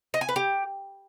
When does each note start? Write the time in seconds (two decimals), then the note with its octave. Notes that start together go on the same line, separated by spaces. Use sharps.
0.14 D#5
0.21 G#5
0.29 B4
0.36 G4